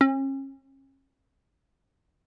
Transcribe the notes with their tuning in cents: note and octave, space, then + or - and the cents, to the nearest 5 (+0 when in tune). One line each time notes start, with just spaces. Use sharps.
C#4 -40